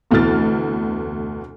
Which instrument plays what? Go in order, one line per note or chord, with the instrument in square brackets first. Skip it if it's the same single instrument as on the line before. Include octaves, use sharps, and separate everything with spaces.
[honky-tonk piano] F1 D2 B2 E3 F6 A6